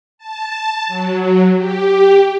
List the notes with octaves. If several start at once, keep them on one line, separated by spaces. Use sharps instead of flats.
A5
F#3
G4